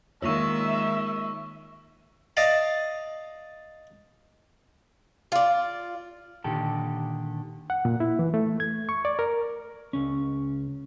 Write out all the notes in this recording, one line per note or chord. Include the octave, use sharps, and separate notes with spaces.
D#3 G#3 A#3 F4 C#5 E5 C#6 E6
D5 D#5 F5 A5
F4 D5
A#2 D3 D#3 G4 A4
F#5
A#2
E4
E3
A3
G#6
C#6
D5
A#4
C#2 C#4